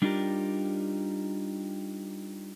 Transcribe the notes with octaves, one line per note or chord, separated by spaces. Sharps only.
G3 D4 D#4 F4 G4 A#4